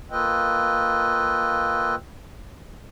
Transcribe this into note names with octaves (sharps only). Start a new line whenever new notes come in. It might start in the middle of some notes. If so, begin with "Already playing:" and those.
A#3 F4 A4 B4 D#5 G5